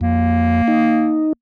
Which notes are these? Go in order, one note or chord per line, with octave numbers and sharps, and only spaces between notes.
F2 A#3
D#4